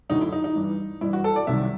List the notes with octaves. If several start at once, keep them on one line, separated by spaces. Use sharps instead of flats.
D2 D3 F#3 D#4
E4
D#4
D#4
G2 E3 G3
G2 E3 G3 E4
F#4
A4
D5
C2 C3 D#3 F#3 E5